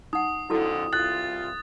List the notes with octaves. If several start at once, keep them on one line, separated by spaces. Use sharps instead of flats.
D#4 F#5 D#6
F2 D3 E4 F#4 A4
C2 F4 F#6 A6